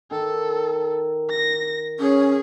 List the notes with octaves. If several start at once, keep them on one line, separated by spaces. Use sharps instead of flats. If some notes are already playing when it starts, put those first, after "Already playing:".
D#3 A4
A#6
C#4 G#4